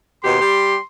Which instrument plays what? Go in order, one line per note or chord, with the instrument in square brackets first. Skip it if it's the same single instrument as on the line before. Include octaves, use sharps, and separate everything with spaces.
[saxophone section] D#2 B2 G4 [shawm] C6
[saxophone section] G3 G4